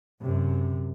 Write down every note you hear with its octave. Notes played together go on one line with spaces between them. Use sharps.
F#2 C3